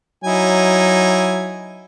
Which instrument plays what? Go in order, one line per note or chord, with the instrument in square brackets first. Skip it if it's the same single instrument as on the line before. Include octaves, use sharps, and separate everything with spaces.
[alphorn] F#3 [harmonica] D#4 E4 G#5